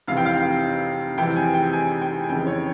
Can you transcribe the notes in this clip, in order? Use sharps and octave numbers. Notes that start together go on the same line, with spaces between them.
F2 C3 E3 F5
G5
F5
F2 C3 E3 G5
G#5
G5
G#5
G5
G#5
F2 C#3 E3 G5
C#5